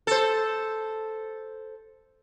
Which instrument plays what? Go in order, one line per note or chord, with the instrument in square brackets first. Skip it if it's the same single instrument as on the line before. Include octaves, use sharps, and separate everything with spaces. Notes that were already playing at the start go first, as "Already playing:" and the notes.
[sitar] A4 C5